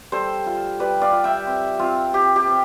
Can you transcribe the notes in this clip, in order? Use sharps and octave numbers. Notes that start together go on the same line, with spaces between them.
G3 A4 C5
F4
G3 B4 D5
D5 F5
F4
E5 G5
C4
C4 F4
C4 G4
G4
C4